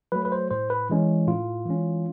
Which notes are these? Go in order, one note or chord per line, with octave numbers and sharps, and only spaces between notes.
F#3 A3 B4
B4
C5
A2 C5
B4
E3 G#3 C#4
A2 F4
E3 G#3 C#4